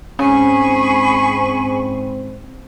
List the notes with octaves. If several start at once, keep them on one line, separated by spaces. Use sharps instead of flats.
G#2 C4 C#4 G#4 G#5 B5 C#6